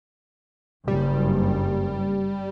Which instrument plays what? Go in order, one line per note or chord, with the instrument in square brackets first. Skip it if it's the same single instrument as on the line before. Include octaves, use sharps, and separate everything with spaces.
[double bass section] F#1 G2 [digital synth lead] G3